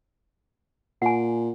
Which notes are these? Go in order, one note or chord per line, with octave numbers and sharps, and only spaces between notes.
A#2 F#5 G#5